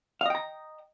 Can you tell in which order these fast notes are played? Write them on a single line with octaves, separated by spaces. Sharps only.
F5 D#5 G5 A#5